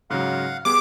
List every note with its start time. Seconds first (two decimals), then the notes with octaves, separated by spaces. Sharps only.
0.10 G#2 C#3 F#3 F5 F#5
0.65 G3 B3 G#4 D6